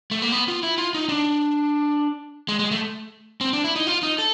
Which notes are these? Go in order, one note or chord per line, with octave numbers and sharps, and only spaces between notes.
A3
A#3
B3
F4
E4
F4
D#4
D4
G#3
G#3
A3
C4
D4
E4
D#4
F4
D#4
A4